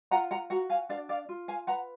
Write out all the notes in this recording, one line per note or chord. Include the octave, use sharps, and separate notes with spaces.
F4 F#5 A#5
F#5 A#5
F#4 F#5 A#5
F5 G#5
D4 D5 F5
D5 F5
F4
F5 G#5
B4 F#5 A#5